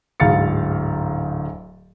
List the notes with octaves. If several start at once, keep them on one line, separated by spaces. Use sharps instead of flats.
D1 G#2 F5 A6 C#7